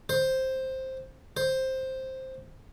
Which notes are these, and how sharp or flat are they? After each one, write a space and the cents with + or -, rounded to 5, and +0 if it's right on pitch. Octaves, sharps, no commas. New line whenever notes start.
C5 +5
C5 +5